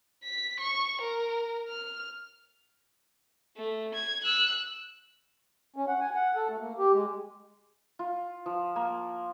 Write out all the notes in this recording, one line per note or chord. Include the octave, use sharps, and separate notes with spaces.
B6
C#6
A#4
F6
A3
G#6
E6 F#6
C#4
F#5
G#5
F#5
A4
A3
A#3
G4
G#3
F4
F3
A#3